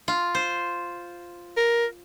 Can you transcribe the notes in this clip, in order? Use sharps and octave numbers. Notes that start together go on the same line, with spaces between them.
F4
C5
A#4